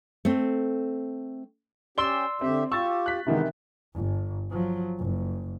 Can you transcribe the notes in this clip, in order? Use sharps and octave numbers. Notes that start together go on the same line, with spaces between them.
A3 C4
C#4 G4 D5 C6 E6 G7
D3 C4 G4 E5
F4 G4 C#6 E6 A6
F#6 B6
C3 D#3 E3 G#3 B3 D#4
G1
F3 F#3
F#1